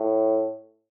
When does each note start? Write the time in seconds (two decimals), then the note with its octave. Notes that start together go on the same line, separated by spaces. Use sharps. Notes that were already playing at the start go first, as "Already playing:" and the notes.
Already playing: A2